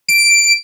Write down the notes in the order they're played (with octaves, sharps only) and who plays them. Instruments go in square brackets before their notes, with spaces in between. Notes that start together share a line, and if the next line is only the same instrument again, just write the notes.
[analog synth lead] D7